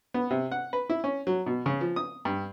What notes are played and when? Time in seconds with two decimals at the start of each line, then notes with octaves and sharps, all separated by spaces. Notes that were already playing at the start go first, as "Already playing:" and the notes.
0.14 B3
0.31 C3
0.52 F#5
0.73 B4
0.90 E4
1.04 C#4
1.27 F#3
1.46 B2
1.66 C#3
1.81 F3
1.96 D#6
2.25 G2